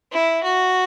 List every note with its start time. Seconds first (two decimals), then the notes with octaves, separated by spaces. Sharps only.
0.12 E4
0.43 F#4